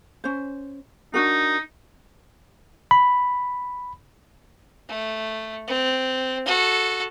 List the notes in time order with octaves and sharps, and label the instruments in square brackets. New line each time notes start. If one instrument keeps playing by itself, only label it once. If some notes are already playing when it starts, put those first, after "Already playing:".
[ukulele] C#4 C5
[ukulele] D4 F#4 A#4 [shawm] D#4
[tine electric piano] B5
[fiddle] A3
C4
F#4 A4